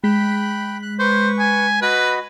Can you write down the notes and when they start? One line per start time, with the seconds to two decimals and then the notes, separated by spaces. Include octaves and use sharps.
0.04 G#3 G5 B5 F#6 B6
0.83 F#6
1.00 B4 C5 C#6
1.39 G#5
1.82 F#4 B4 D#5 B5